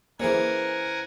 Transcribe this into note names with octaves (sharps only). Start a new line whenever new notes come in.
E3 A#3 C#4 G#4 A#4 C5 F#5 G#5